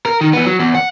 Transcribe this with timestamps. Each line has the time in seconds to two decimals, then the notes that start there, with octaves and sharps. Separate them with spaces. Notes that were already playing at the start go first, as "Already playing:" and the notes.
0.06 A#4
0.21 D#3
0.33 E3 B3
0.45 F#3
0.59 E2
0.75 F#5